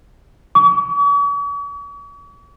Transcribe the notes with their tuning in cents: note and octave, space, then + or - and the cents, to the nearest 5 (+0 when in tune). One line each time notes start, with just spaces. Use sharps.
C#6 +45